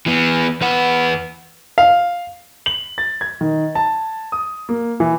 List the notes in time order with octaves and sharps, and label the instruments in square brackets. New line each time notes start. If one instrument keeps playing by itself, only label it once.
[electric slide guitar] E3 B3
E2 B4 F#5
[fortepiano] F5
[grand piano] F#7
A6
G#6
D#3
A5
D#6
A#3
E3